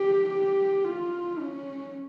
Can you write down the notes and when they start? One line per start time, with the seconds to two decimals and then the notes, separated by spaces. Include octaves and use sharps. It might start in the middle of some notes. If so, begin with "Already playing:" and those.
Already playing: G4
0.30 G4
0.85 F4
1.40 C#4